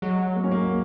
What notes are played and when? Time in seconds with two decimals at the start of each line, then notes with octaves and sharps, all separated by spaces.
0.02 F#3 G#3
0.36 A#3
0.44 C#4
0.51 A#3